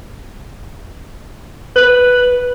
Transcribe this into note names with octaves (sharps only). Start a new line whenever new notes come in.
B4